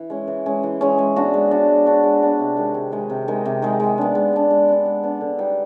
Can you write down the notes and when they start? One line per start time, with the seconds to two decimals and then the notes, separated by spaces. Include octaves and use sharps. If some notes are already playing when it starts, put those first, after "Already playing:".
Already playing: E3
0.10 G#3 C#4
0.28 E3
0.46 G#3 C#4
0.63 E3
0.81 G#3 C#4
0.98 G#3
1.16 B3 D4 F#4
1.34 G#3
1.51 B3 D4 F#4
1.69 G#3
1.86 B3 D4 F#4
2.03 G#3
2.22 B3 D4 F#4
2.39 C3
2.57 D#3 G#3
2.74 C3
2.92 D#3 G#3
3.10 C3
3.28 D#3 G#3
3.45 C3
3.62 D#3 G#3
3.80 G#3
3.98 B3 D4
4.15 G#3
4.33 B3 D4
4.50 G#3
4.68 B3 D4
4.85 G#3
5.03 B3 D4
5.21 D3
5.38 G3 B3 D#4